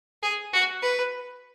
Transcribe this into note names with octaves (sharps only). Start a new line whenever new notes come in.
G#4
F#4
B4